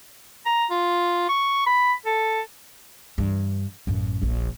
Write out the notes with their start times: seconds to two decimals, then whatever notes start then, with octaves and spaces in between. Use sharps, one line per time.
0.46 A#5
0.70 F4
1.29 C#6
1.66 B5
2.06 A4
3.18 G2 E3
3.87 A1 F#2
4.22 D#1 A#1